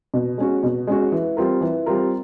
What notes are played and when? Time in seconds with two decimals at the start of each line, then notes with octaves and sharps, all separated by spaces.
0.14 B2
0.38 G#3 C#4 F#4
0.63 B2
0.87 G#3 C#4 F#4
1.12 E3
1.37 G3 C4 F4 A#4
1.61 E3
1.86 G3 C4 F4 A#4